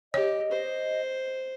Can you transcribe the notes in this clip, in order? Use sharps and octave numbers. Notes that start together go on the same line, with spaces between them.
G4 C#5 D#5
C5